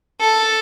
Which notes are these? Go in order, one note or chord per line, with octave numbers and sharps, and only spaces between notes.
A4